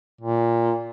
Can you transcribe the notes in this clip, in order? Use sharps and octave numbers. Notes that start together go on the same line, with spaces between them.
A#2